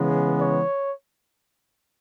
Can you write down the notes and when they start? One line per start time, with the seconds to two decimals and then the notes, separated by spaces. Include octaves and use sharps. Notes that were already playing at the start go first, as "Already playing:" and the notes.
Already playing: C#3 E3 G#3 B3
0.39 C#5